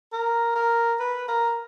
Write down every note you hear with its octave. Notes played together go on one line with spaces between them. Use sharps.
A#4
A#4
B4
A#4